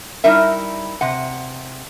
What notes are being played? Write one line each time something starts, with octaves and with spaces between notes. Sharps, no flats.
G3 D#4 E4 A#4 E5
C3 F#5